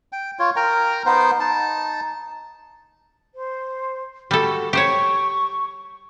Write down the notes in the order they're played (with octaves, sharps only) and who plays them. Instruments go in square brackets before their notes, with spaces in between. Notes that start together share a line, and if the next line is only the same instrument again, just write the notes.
[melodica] G5
F4 C#5
A#4 G5 A#5
B3 D#4 C5
D#4 A5
[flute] C5
[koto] G3 A4 [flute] F#4
[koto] G4 C5 C#5 [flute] C#6